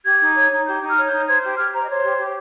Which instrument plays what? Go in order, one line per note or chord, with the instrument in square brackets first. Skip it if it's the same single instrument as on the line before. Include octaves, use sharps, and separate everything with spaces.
[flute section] G4 G#6
D#4
C#5
D#4
G4 G6
D#4
F6
C#5
G6
D#4
C5 G#6
G4 G6
G4 F6
C5 A#5
D#5
C5 C#5
G4
G4